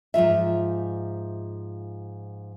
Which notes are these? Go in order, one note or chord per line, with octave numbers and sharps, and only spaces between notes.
G#2 F3 F4 E5